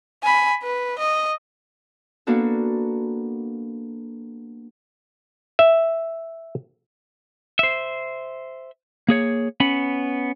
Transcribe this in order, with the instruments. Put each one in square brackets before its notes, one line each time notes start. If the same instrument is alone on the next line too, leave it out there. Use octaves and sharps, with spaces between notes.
[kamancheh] G#5 B5
B4
D#5
[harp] A#3 B3 D4 F#4 A4
[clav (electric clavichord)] E5
[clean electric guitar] C5 E5
A#3 G#4 C#5
B3 C#4 B5